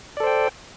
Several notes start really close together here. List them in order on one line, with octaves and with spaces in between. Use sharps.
D5 A4 C5 G5